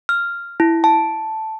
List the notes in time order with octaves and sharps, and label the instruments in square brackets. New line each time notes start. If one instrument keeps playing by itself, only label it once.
[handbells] F6
E4
A5